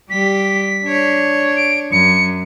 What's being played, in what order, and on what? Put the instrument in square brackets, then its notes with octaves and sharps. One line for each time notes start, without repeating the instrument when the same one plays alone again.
[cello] G3 G4 [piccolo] B6
[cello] D4 C#5
[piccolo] D7
[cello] F#2 [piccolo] C#7